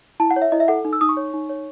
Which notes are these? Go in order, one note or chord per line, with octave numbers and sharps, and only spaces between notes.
E4 A5
F#5
C#5
E5
E4 D#5
E5
A4 F#5
D#4
E6
D#4 D#6
C#6
C#5
D#4
C#5